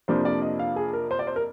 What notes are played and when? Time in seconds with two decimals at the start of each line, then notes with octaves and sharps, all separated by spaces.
0.08 F2 C3 F3 A#3 D4 C5
0.25 D5
0.42 D#5
0.59 F5
0.76 G#4
0.93 A#4
1.11 C5
1.19 D5
1.27 C5
1.36 A#4